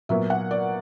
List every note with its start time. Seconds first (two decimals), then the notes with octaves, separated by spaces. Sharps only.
0.09 A#2 F#3 B3 E5
0.30 F#5
0.51 D5